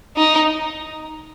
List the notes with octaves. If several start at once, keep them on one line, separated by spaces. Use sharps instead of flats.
D#4